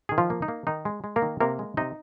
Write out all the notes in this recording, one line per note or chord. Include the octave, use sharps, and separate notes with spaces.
D#3 G#4
F3 F4
A#3
D#4
A#3
D#3 D#4
G#3
G#3
A#3 A#4
D#3
C3 A#3 A#4
G#3
C3 D#4 D#5